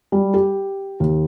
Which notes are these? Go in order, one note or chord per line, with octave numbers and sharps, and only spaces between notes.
G3
G4
D#2